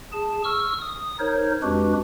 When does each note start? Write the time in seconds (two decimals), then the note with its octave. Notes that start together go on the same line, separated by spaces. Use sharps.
0.12 G#4 A5
0.44 C#6 E6 F6
0.80 D#6
1.19 D#4 A#4 C5 C#5
1.63 F2 G#3 D4 F#4 G4 B4